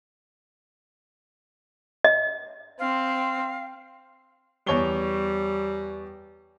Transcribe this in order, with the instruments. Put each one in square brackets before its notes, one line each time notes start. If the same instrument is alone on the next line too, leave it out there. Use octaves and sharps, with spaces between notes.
[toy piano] D#5
[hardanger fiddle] C4 [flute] F5
[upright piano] E2 C#5 G7 [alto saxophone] G3